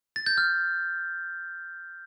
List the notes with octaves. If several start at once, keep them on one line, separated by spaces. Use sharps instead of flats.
A6
G6
F6